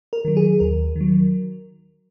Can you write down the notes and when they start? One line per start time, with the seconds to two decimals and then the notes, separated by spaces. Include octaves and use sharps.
0.13 A#4
0.25 D#3 F#3
0.37 G#4
0.60 D#2 A#4
0.96 D#3 F#3